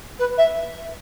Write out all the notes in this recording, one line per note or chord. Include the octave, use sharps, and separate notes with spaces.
B4
E5